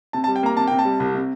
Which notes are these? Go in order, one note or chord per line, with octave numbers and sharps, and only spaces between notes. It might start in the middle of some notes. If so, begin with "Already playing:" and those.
C3 A5
A5
G3
G5
A#3 A#5
C3 A5
C3 G5
A5
G3
C2
C3